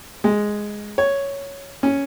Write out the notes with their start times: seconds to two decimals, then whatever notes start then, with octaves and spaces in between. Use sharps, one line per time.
0.24 G#3
0.98 C#5
1.83 C#4